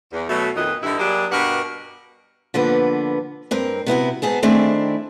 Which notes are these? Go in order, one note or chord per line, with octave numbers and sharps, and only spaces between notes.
E2
B2 F#3 A3
F2 A#2 D#3 B4 D#5
G2 D3 D#3 D#4 E4
F#3 G3 A#3 D4 G4 G#4
G2 B2 G4 A#4 B4 F#5
D3 F3 A#3 B3 B4
G2 C4 A#4
C3 B3 E4 F#4
G#2 B3 G#4 A5
D#3 A3 C4 D4 E4 G#4